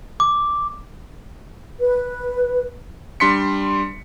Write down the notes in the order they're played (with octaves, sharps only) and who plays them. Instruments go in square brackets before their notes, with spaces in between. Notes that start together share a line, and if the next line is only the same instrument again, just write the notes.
[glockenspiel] D6
[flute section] B4
[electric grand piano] G3 D4 C6 B6 C#7